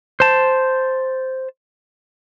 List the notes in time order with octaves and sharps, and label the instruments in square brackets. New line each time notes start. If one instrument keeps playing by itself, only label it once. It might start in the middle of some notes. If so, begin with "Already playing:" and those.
[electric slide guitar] C5 A5